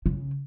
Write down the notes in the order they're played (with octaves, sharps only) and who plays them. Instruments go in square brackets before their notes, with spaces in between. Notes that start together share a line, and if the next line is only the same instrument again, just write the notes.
[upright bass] C#3